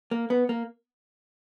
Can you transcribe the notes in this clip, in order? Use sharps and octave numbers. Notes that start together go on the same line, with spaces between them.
A#3
B3
A#3